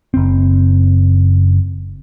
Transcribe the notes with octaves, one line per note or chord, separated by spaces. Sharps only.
F#1 C4